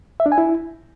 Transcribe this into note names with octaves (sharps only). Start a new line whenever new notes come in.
E5
D4
G#5
E4